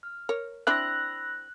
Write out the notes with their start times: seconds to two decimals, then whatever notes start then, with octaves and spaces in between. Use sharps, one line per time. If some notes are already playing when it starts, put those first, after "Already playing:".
0.03 F6
0.29 A#4 C#5
0.67 C4 D4 E4 B5 E6 F#6 A#6